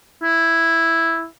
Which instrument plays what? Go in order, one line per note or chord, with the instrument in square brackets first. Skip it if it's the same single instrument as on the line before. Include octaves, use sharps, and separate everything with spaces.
[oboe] E4